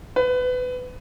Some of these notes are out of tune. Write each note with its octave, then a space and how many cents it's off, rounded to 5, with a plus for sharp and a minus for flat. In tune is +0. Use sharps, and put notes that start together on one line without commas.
B4 +25